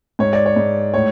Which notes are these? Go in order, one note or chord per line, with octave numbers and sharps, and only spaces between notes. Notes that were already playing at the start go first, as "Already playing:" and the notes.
G#2 C#5
D5
C#5
G#2
A2 C#5